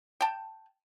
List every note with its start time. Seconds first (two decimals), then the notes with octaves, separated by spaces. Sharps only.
0.21 G5 A5